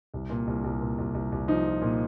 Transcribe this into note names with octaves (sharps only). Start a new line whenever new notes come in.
C2
A#2
C2
C2
A#2
C2
C2
C2
F3 D#4
F3
A#2